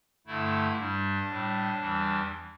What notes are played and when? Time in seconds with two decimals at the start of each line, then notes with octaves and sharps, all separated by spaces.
0.27 G2 D3 A3 E4
0.77 G2 G3 D4
1.29 A2 G3
1.80 E2 E3 G3